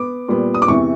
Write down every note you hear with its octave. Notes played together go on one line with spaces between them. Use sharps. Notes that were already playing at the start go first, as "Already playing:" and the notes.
Already playing: B3 D6
A#2 G3 B3
D#6
D6
E2 C3 E3 C#6